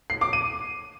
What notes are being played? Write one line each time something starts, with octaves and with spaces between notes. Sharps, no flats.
C7
D6
D#7